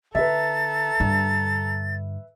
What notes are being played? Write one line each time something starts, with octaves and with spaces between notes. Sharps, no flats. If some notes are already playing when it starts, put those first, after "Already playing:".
D3 A4 B4 E5 A#5 A6
G2 D3